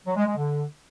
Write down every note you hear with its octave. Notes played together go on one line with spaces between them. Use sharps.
F#3
G#3
G#3
D3